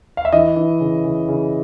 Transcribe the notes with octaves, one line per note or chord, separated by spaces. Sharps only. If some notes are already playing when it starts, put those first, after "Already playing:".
F5
E5
E3 D#5
E3
C#3
C#3
C#3